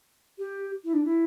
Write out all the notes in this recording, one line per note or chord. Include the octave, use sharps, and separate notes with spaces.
G4
E4
D4
E4